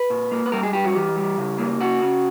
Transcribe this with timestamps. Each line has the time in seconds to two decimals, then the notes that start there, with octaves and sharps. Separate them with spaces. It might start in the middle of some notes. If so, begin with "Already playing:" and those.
Already playing: B4
0.10 A#2
0.31 A#3
0.46 B4
0.52 G3 A#4
0.63 G#4
0.73 G2 G4
0.84 F#4
0.95 E3 G4
1.16 G3
1.38 C#3
1.58 A#3
1.80 C#3 F#4
2.02 C#3